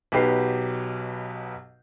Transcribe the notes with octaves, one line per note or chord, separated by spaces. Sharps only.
B1 B2 F#3 G4 B4 C7